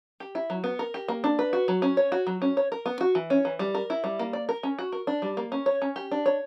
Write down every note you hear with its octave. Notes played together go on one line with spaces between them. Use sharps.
G4
E4
F#3
B3
A#4
G4
A#3
D4
B4
F#4
F#3
C#4
C#5
F#4
F#3
C#4
C#5
A#4
B3
F#4
E3
C#4
E3
G3
A#4
E4
G3
A#3
D5
A#4
C#4
F#4
A#4
D4
G3
A#3
C#4
C#5
C#4
G4
D4
C#5